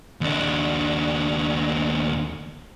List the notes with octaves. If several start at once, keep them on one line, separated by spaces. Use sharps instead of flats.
D#2 D4